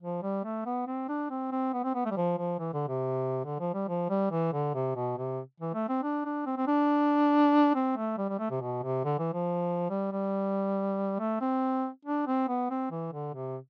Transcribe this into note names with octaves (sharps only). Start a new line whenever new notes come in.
F3
G3
A3
B3
C4
D4
C4
C4
B3
C4
B3
A3
G3
F3
F3
E3
D3
C3
D3
F3
G3
F3
G3
E3
D3
C3
B2
C3
E3
A3
C4
D4
D4
C4
C4
D4
C4
A3
G3
G3
A3
C3
B2
C3
D3
E3
F3
G3
G3
A3
C4
D4
C4
B3
C4
E3
D3
C3